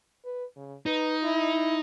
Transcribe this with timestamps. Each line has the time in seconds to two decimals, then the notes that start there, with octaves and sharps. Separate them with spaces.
0.25 B4
0.56 C#3
0.86 D#4 B4
1.23 E4